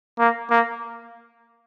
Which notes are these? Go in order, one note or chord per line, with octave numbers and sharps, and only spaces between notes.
A#3
A#3